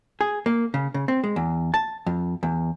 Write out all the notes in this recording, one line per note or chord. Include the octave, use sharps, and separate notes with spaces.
G#4
A#3
C#3
C#3
C4
G#3
E2
A5
F2
E2